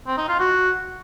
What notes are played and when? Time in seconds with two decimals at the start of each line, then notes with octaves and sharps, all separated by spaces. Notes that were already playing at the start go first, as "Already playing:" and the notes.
0.07 C4
0.18 D#4
0.28 F4
0.39 F#4